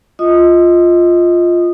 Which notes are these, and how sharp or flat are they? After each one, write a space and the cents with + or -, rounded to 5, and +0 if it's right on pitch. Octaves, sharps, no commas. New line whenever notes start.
F4 +0 D#5 +20 D#6 -20